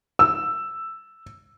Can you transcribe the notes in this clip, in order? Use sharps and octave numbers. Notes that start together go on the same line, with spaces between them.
E6